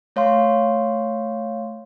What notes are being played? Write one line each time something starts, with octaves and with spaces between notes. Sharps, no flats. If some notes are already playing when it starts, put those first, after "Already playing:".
A3 C#5 F5 C6